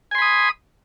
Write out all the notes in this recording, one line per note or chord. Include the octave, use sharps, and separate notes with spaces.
G#5 B5 C6 D#6